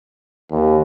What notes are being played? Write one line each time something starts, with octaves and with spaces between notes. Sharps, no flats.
D#2